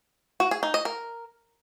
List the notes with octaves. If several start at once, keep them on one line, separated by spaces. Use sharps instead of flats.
F#4
G#4
D#4
D#5
A#4